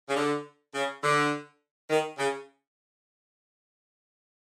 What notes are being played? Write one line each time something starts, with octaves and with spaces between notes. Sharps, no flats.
C#3
D3
C#3
D3
D#3
C#3